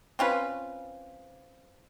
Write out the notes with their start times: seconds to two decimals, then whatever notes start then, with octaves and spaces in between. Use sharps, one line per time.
0.19 C4 C#4 F4 B4